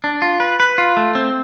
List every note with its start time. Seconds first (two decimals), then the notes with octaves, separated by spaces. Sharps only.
0.04 D4
0.22 F4
0.40 B4
0.60 B4
0.78 F4
0.97 A3
1.15 C4